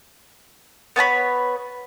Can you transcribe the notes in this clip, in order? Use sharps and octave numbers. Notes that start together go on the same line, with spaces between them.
B3 C#5 A5 B5